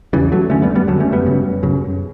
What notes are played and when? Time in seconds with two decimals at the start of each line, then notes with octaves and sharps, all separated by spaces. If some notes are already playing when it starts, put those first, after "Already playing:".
0.13 C#3 E3 G3
0.17 E2
0.32 F#3 A3
0.50 F#2 D3 A3 C#4
0.62 G3 B3
0.75 G3 B3
0.87 F#2 D3 F#3 A3
1.00 A3 C#4
1.12 G3 B3
1.25 F#2 C#3
1.63 F#2 C#3